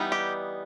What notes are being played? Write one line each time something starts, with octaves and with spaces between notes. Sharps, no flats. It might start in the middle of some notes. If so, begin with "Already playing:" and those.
Already playing: E3 G3 B3 D#4
G4